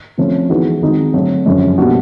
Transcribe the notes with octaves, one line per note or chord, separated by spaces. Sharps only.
C3 F3 A3 C#4
E3 G#3 B3 D#4 F#4
D#3 G#3 C4 D#4 F#4
D3 F#3 A3 C4
F#2 C#3 F3 G#3
B2 G3 A#3 D4 F#4